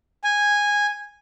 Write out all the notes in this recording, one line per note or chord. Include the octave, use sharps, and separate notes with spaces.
G#5